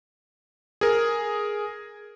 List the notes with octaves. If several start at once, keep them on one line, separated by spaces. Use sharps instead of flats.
G#4 A#4